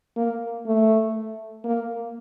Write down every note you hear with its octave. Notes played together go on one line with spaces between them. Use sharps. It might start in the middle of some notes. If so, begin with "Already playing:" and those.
A#3
A3
A#3